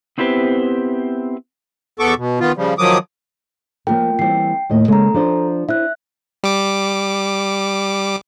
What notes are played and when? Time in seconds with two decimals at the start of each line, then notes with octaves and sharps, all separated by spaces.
0.18 B3 C4 E4 G4 B4 C5
1.99 E2 B3 A4 C#6 D6
2.17 B2
2.40 D#3 B3 F4
2.57 C#3 F3 G3
2.78 D#3 F3 F#3 D6 D#6
3.87 F3 A#3 F4 A#4 G5
4.19 E3 G3 C4 G5 C7
4.70 D#2 A2 D#5
4.88 C#3 G#3 A#3 A4 A#5
5.14 F3 D4 C5
5.69 E4 C5 E5 F#6
6.43 G3 D6